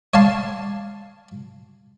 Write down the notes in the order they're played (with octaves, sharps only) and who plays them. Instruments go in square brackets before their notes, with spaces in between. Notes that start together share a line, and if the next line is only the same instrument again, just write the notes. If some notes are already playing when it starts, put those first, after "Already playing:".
[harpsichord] C#5 D5 F5 A5 C6